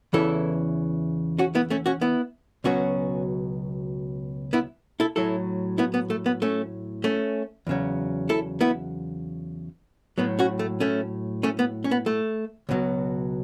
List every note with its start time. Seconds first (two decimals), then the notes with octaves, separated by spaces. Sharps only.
0.13 E2 C#3 E3 E4 A4
1.39 C#4 F#4
1.55 B3 E4
1.70 A3 C#4
1.86 C#4 F#4
2.01 B3 E4
2.64 C#2 B2 F#3 C#4 F#4
4.53 B3 E4
5.00 E4 A4
5.16 A2 F#3 E4 A4
5.78 B3 E4
5.94 B3
6.10 A3
6.26 B3
6.42 A3 C#4
7.04 A3 C#4
7.67 E2 C#3 F#3
8.29 E4 A4
8.61 B3 E4
10.18 A2 F#3 B3
10.39 C#4 F#4
10.59 A3
10.80 A3 C#4
11.43 A3 C#4
11.59 B3
11.84 C#4
11.91 B3
12.06 A3
12.69 C#2 B2 F#3